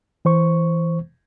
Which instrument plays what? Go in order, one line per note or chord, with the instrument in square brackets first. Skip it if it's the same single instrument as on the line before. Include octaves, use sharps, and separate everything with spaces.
[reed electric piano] E3 C5 C#6